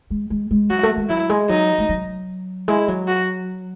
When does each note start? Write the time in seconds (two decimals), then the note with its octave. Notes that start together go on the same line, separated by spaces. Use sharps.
0.10 G#3
0.30 G#3
0.51 G#3
0.70 F#3 F#4
0.83 A3
0.96 G#3
1.09 F#3 E4
1.30 G#3
1.49 F#3 D#4
1.78 G#3
1.89 F#3
2.68 G#3 E4
2.88 F#3
3.07 F#4